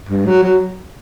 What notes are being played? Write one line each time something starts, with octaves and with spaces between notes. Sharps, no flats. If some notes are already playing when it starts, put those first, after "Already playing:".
G2
F#3
F#3